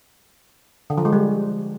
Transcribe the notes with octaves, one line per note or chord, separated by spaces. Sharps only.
D3
F3
G#3
G3